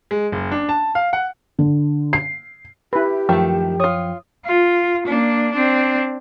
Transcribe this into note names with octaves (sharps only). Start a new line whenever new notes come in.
G#3
F#1
D4
A5
F5
F#5
D3
C7
E4 G4 B4
F#2 D#3 F3 G#3 A3 G5
F4 C#5 D#6
F4
A#3 D4
C4 D4